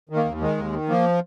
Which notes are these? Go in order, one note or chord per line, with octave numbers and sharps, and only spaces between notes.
D#3
A#3
D#2
D#3 G#3
D#2
D#3
F3 A#3